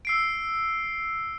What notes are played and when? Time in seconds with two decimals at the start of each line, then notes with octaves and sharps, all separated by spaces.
0.05 E6 C7 D7